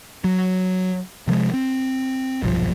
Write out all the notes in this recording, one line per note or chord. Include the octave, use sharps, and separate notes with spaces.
F#3
C3 F3 G3 G#3
C4
D#1 B1 G2 F3